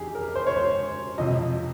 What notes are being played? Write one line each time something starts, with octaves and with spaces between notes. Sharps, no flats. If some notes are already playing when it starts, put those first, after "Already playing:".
Already playing: F2 D#3 G4 G#4
A#4
C5
C#5
C5
F2 C3 F3 D#5